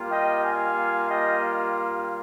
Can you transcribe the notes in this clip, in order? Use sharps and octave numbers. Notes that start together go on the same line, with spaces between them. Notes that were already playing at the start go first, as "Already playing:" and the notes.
Already playing: G3 A#3 F4
D#5 G5
F5 G#5
D#5 G5